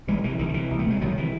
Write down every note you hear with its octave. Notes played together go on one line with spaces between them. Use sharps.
C2 E3 G#3
C3 E3
C2 D#3
D#3
C3 E3
C2
A3
C3 G#3
C2 D#3 F#3
C3 E3